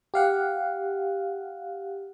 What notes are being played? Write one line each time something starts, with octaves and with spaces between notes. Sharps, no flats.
G4 F5 F#5